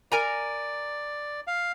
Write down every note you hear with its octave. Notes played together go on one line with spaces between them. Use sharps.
A#4 D5 G#5 A#5
F5